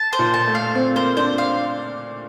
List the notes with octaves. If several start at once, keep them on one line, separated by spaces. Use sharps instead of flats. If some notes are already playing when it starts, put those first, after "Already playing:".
Already playing: A5
C5
A#2
A5
A3
F5
C4 F5
A#3 C5
D4 C5
F5